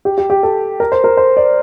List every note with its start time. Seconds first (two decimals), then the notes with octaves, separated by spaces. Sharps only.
0.05 G4
0.18 G4
0.30 G4
0.43 A4
0.80 A#4
0.92 C5
1.04 A#4
1.17 C5
1.37 D5